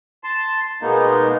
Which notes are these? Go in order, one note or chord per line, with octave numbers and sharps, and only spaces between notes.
A5 C6
B2 G#3 A#3 B3 D#4